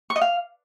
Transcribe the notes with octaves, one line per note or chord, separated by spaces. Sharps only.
C#6
D#5
F5